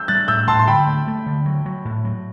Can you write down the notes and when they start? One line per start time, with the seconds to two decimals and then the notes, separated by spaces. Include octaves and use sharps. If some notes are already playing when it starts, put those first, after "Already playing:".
Already playing: E6 G6
0.08 G3 F#6 A6
0.28 A2 E6 G6
0.48 A2 A5 C6
0.59 C6
0.67 D3 G5 B5
0.87 A3
1.07 A3
1.26 D3
1.46 F#3
1.66 F#3
1.85 A2
2.05 F#3